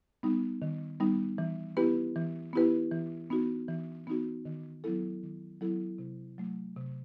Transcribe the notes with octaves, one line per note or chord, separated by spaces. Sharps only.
G3 B3 D#4
D#3
G3 B3 D#4
E3
B3 E4 G4 B4
E3
B3 E4 G4 B4
E3
B3 D#4 F#4
E3
B3 D#4 F#4
D#3
F#3 B3 E4 A4
D#3
F#3 B3 E4 A4
C3
F#3 A3
C3